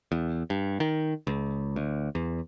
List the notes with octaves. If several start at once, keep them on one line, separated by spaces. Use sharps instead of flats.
E2
G2
D#3
C#2
D2
E2